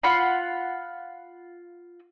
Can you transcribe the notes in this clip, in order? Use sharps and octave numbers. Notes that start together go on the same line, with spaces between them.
F4 F#5 B5 C6